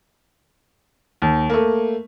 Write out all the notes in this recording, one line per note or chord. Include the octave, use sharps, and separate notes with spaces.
D#2
A3 A#3